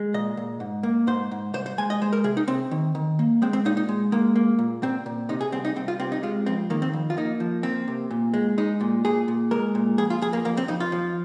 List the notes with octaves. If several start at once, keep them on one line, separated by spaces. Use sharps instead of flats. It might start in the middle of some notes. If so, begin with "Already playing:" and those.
Already playing: G#3
A#2 D#5
A#2
G#2
A#3
G#2 C5
G#2
C2 C5
C5
G#3 G#5
D#5
G#3 C5
A#4
C3 G#4
D#4
C3 C4
D#3
D#3
A#3
G#3 C4
C4
A#2 D#4
D#4
G#3
G#3 A#3
A#3
A#2
A#2 C4
A#2
C3 D#4
G#4
C2 C4
D#4
C2 C4
F4
C3 C4
D#4
G#3 F4
F2 C4
D#3 A#3
C4
F2
F4
A#3 D#4
F3
A#3 C4
C3
A#2
G#3
G#3 D#4
A#2
A#2 G#4
A#2
G#3 A#4
A#2
F2 G#4
F4
F2 G#4
A#3
F2 A#3
C4
F2 D#4
F4
F3